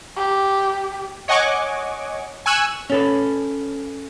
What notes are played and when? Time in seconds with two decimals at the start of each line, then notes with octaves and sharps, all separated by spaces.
0.17 G4
1.28 C#5 D#5 F#5 G#5 C#6 D6
2.46 G#5 C#6 E6 F#6 G#6
2.90 C#4 A4 B4